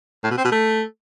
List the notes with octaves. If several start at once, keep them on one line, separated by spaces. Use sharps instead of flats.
A2
B2
C4
B2
A3